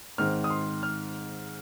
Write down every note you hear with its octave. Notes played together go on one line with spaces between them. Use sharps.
G#2 D#3 C4 F6
D#6
C6
F6